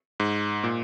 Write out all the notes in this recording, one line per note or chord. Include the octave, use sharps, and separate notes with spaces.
G#2
A#2